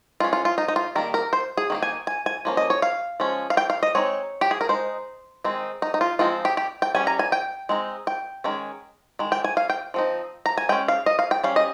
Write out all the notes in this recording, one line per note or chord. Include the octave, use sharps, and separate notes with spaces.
G#3 C#4 F4
F4
F4
D#4
D#4
F4
D#3 G3 A#3 A#4
A#4
C5
G#4
D#3 A#3 D#4
G#5
G#5
G#5
F3 A#3 C#4
D#5
C#5
F5
F3 G#3 C#4
F5
G5
F5
D#5
G#3 C4 D#4 C#5
G4
G#4
A#4
G#3 D#4 C5
D#3 G#3 C4 D#4
D#4
D#4
F4
F3 G#3 C4 D#4 F4
G4
G4
G5
G3 C#4 G#5
A#5
G#5
G5
G#3 C4 D#4
G5
D#3 G#3 C#4
D#3 G#3
G5
G#5
F5
G5
F3 C4 D#4
A#5
G#5
G#3 C#4 G5
F5
D#5
F5
G5
G3 C#4 F5
D#5